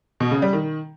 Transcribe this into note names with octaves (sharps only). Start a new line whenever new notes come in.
B2
C#3
G3
D#3